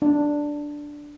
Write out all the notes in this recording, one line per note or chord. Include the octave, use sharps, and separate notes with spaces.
D4